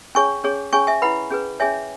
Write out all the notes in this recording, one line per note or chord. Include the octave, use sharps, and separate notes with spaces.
C#4 G#4 C#5 G#5 C#6
C#4 G#4 C#5
C#4 G#4 C#5 G#5 C#6
E5 G#5
E4 B4 F#5 B5
C#4 G#4 B4
C#4 G#4 C#5 E5 G#5